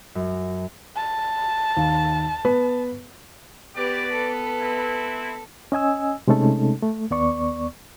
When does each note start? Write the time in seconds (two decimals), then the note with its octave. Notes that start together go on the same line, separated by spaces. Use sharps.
0.15 F#2
0.96 A5
1.77 D#2
2.45 B3 B4
3.76 B3 F#4 G4 B4 D5 D6
4.12 A4
4.60 C4 E4
5.72 C#4 D#5 G#5 E6
6.28 C3 G#3 A3 C#4 D#4 A4
6.82 A3
7.11 D#2 B3 D5 C#6